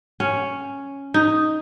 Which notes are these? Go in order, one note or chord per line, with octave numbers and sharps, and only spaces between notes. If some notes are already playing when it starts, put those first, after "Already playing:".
C#4
D#4